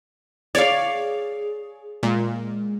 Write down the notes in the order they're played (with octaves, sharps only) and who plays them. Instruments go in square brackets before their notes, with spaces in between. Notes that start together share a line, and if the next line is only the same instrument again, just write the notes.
[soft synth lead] G#4 [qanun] C#5 F5 [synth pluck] D5
[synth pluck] A#2 [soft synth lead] G#3